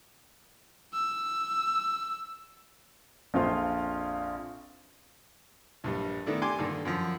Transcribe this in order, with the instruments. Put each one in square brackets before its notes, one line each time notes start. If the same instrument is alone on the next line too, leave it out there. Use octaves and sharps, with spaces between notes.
[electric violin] E6
[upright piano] A#1 F2 F4 C5 F5 C6
[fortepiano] A#1 G2 G3
D#3 A3 B3 D4 E4
G4 D5 G#5 C6 D6
G2 A#2 D3 D#3
F#2 F3